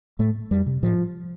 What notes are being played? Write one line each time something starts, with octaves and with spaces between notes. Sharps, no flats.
A2 A3
F2 G3
C3
A2 F3